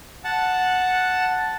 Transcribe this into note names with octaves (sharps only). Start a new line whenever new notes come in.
F#5 A5